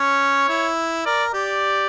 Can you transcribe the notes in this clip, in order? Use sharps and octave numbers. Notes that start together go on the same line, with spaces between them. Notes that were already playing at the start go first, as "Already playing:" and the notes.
Already playing: C#4 C#5
E4
A#4 D5
G4 D5